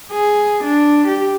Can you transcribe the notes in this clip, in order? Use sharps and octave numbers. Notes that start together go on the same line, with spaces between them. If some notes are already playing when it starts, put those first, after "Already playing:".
G#4
D4
G4